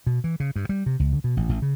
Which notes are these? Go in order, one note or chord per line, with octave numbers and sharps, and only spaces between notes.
B2
E3
C#3
G2
G3
C3
C#2
D3
B2
A1
A1
C#3